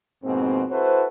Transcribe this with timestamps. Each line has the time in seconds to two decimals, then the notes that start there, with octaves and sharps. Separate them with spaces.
0.24 F2 G#2 B2 A#3 C4
0.70 E4 F#4 A4 B4 C5